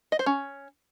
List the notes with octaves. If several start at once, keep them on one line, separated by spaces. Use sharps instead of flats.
D#5
C5
C#4